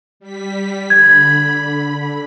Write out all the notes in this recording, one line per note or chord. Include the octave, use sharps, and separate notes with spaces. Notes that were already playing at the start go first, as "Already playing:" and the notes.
G3 B6
D3 B5 G#6